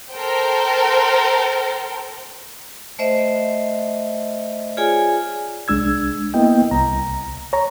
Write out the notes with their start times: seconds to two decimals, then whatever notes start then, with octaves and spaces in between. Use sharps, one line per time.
0.11 A4 A#4 C5 G5
2.99 A3 C5 D#5 E5
4.77 F4 G#4 C#5 D5 G#5
5.68 C2 G#3 D4 E6 G#6
6.34 A#3 B3 E4 D#5 G5
6.71 C2 A#5
7.53 C#5 A#5